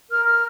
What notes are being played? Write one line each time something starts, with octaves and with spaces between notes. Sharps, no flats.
A#4 F6
F6